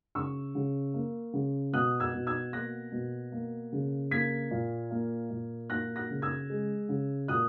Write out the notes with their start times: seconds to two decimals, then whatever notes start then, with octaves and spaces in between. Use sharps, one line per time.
0.15 C#3 C#6 E6
0.55 C#3
0.94 A#3
1.33 C#3
1.73 B2 D#6 F#6
2.00 E6 G#6
2.13 B2
2.27 E6 G#6
2.53 A#3 F#6 A#6
2.92 B2
3.32 A#3
3.72 C#3
4.11 A#3 G#6 B6
4.51 A#2
4.91 A#3
5.30 A#2
5.70 A#3 F#6 A#6
5.96 F#6 A#6
6.10 C#3
6.22 E6 G#6
6.50 G#3
6.89 C#3
7.28 A#2 D#6 F#6